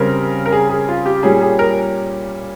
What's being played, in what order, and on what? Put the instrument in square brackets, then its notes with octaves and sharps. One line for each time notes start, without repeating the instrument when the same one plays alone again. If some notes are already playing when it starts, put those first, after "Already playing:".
Already playing: [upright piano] C#3 G3 C4 A#4
A#4
G#4
G#4
F4
G4
A#2 G3 C#4 G#4
G#4
A#4